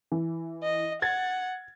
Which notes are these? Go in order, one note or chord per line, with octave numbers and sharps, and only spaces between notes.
E3
D#5
F#5 G#6 A6